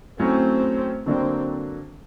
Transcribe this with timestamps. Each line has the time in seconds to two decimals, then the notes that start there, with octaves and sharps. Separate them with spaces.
0.19 F#3 A3 C4 C#4 E4
1.06 D3 F#3 A#3 C4 D4